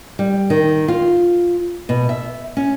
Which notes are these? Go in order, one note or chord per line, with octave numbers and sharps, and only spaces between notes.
G3
D#3
F4
B2
E5
C#4